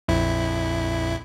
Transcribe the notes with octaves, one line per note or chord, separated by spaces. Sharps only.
A#1 F2 E4